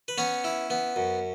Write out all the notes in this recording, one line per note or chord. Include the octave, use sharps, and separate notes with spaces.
B4
B3 C#4 C#5
E4
B3
F#2